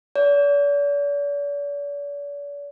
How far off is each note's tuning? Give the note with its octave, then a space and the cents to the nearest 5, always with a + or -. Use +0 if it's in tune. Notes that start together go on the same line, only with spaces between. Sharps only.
D5 -45